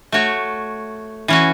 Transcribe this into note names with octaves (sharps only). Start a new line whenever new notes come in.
A3 F#4 C#5
E3 C#4 F#4